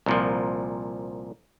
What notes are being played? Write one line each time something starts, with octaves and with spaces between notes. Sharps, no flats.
C2 A#2 F3